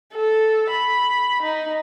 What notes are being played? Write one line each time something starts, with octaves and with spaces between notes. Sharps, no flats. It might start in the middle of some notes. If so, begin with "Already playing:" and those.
A4
B5
D#4